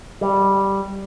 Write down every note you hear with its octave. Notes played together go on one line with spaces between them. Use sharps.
G3